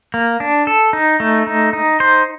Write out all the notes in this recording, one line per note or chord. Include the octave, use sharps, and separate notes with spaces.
A#3
D4
A4
D#4
A3
D#4
D#4
C5